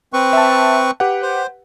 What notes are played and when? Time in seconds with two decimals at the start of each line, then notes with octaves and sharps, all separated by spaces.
0.13 C4 B4 C#6
0.33 E5 A5
1.00 G4 B4 F#5
1.22 C5